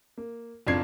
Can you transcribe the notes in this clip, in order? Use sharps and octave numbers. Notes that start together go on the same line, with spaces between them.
A#3
F#1 F2 D4 F4 G#6 C7